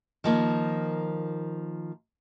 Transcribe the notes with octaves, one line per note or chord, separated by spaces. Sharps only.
D#3 F3 A#3